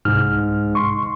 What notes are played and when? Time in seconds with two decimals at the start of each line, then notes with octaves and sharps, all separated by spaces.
0.05 C2 G#2 F6
0.75 C6 C#6